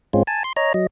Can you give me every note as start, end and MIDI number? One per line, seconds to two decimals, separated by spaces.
0.13 0.23 44
0.13 0.23 56
0.13 0.23 60
0.13 0.23 61
0.13 0.23 65
0.27 0.43 80
0.27 0.43 81
0.44 0.53 84
0.56 0.73 73
0.56 0.73 75
0.56 0.73 82
0.74 0.87 54
0.74 0.87 75